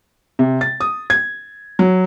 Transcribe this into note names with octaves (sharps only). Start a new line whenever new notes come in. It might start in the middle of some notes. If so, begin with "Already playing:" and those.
C3
A6
D#6
G#6
F#3